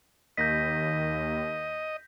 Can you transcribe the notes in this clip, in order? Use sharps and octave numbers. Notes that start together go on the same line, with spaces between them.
D#2 D#5 G6 A#6 B6